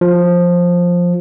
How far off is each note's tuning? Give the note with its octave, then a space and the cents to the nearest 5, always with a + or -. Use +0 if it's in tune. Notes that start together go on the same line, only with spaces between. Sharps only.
F3 +10